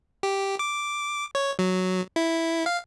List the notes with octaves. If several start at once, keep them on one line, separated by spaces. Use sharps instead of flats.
G4
D6
C#5
F#3
E4
F5